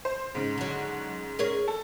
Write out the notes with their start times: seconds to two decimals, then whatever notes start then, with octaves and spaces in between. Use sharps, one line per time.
0.05 C5
0.35 G#2 C#3
0.58 D3 F#3
1.39 G#4 A#4 C#5
1.68 A4